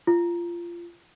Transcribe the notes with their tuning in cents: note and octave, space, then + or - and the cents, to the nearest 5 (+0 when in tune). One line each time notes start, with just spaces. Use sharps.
F4 -20